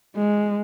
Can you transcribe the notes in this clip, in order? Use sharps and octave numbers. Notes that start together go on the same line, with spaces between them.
G#3